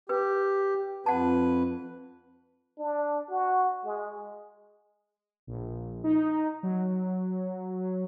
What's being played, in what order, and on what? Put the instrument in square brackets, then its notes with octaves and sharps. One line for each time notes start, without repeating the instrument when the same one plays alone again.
[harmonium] G4 [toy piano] B4
[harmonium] F2 B4 [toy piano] F#5 A5
[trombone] D4
F#4
G#3
[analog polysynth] A#1
D#4
F#3